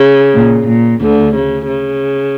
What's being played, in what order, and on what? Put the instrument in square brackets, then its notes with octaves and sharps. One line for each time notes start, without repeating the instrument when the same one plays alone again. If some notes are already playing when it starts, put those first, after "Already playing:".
Already playing: [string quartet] C#3
A#2
A#2
D2 D3
C#3
C#3